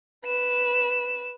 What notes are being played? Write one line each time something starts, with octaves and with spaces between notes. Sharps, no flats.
B4 E7